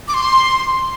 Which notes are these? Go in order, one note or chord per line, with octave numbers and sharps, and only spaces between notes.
D6
C6